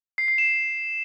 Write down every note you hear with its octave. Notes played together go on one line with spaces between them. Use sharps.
C7
C7
E7